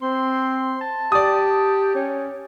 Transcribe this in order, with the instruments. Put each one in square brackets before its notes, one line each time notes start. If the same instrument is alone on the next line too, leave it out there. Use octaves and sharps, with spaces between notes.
[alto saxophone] C4 [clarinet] C6
[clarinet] A5
[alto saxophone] G4 [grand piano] D5 D#6
[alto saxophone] C#4